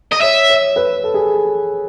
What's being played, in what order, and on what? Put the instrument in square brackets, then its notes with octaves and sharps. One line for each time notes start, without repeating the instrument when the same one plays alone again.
[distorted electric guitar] D#5
[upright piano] C#5 [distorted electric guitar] E5
[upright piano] C#5
B4
A4
G#4